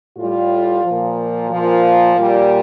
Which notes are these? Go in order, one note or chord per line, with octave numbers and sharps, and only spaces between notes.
A2 G3 F4
A#2 F3
A#2 F3 F4
A#2 G3